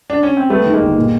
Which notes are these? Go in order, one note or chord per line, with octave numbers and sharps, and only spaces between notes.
D4
C#4
C4
G3 A3 B3
D#3
G#3 A#3
G1
A#2